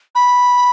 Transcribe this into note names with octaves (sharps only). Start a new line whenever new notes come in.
B5